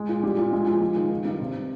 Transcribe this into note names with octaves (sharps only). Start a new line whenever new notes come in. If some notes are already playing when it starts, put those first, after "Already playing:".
Already playing: G#3
A#2
G3
A#2
G#3
F3
G#3
D#3
D#3
G2
C3